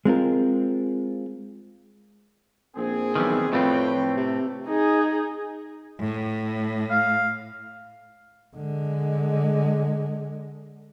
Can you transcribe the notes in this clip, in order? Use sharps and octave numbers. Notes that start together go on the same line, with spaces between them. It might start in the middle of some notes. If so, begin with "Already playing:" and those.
G#3 C4 F4 A#4
A#1 C4 G#4
B1 D#3 E3 G3
F2 A2 A3 C4 B4 C#5 G5
C3
D#4 G#4
A2
F5
D3 G#3